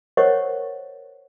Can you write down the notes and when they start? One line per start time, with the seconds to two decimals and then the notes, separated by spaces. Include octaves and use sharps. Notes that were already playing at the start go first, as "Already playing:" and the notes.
0.17 A#4 C5 C#5 D#5 F#5 C#6